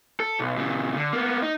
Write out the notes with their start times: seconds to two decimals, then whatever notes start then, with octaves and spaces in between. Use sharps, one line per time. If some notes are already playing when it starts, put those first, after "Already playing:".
0.20 A4
0.40 B1
0.57 A#2 C#3
0.97 D3
1.13 A#3 B3
1.42 D#4